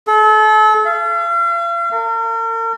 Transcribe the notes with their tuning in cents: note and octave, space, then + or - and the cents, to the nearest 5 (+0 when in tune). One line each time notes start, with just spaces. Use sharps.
A4 -35
F5 -45
A#4 -40